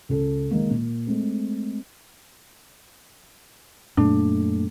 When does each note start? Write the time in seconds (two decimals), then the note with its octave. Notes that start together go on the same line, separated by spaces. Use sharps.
0.09 C#2 C#4 A4
0.51 D#3 G#3 A#3
0.70 A#2
1.07 G#3 A3 C4
3.97 F#2 A#2 A3 D4